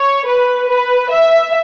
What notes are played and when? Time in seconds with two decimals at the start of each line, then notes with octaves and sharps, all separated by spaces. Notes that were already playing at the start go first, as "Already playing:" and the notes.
Already playing: C#5
0.26 B4
0.68 B4
1.11 E5